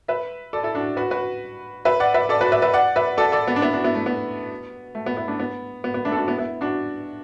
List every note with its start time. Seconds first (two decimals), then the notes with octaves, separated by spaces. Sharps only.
0.08 B4 E5
0.53 A4 D5
0.63 E4 A4
0.75 D4 F#4
0.97 F#4 B4
1.11 F#4 B4
1.85 B4 E5
2.00 D5 F#5
2.14 B4 E5
2.29 A4 D5
2.41 F#4 B4
2.52 B4 E5
2.62 B4 E5
2.73 D5 F#5
2.96 B4 E5
3.18 A4 D5
3.32 A4 D5
3.48 B3
3.56 D4
3.62 B3 E4
3.73 D4 F#4
3.84 B3 E4
3.95 A3
4.06 B3
4.95 A3
5.06 B3
5.17 B3 E4
5.28 A3 D4
5.40 B3
5.84 B3
5.94 B3
6.05 A3 D4
6.12 A4
6.16 D4 F#4
6.27 B3 E4
6.38 B3 E4
6.61 D4 F#4